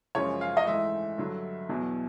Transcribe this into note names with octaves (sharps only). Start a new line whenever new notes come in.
F#2 C#3 F3 G#3 C#5
F5
D#5
G#2 E3 A3 E5
G2 D3 F#3
E2 B2 F#3